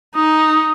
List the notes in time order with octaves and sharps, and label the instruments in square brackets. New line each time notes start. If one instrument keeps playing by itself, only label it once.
[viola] D#4 [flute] D#6